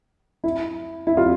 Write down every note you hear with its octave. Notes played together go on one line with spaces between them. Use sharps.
E4
E4
F4